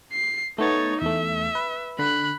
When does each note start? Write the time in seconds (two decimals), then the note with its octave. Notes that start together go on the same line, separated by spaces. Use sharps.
0.13 C7
0.58 A3 B3 D#4 C#5 A6
1.02 E2 A3 E5
1.55 B4
1.99 D3 B5 F#6